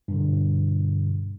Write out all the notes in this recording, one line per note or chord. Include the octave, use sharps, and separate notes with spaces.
G2 B2 D3